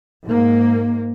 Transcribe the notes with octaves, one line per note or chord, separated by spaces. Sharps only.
G#2 A#3